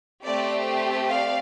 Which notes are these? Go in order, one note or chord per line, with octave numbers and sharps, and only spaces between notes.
A3 C4 G4 D5
D5 F5